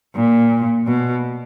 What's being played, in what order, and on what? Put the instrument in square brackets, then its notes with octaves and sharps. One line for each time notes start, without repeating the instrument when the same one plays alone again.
[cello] A#2
B2